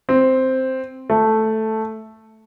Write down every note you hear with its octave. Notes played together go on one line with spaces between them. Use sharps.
C4
A3